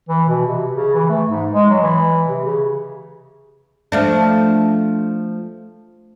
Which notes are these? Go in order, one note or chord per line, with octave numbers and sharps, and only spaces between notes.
E3
B2
C3
C#3
E3
A3
G#2
G#3
F#3
E3
C3
C#3
F3 A3 D4